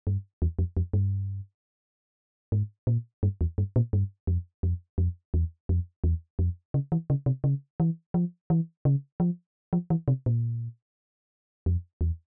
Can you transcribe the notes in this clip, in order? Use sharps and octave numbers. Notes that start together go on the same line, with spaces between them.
G2
E2
F2
F2
G2
G#2
A#2
G2
E2
G2
A#2
G2
F2
F2
F2
E2
F2
E2
F2
C#3
E3
C#3
C3
C#3
E3
F3
E3
C#3
F3
F3
E3
C3
A#2
F2
E2